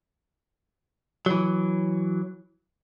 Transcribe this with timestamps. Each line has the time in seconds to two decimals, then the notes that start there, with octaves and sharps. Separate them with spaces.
1.26 E3 F#3